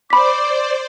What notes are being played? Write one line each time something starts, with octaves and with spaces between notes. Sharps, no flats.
C5 D5 B5 D6 B6